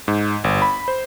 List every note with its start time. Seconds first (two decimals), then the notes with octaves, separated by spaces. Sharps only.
0.08 G#2
0.44 G1
0.62 B5
0.88 C5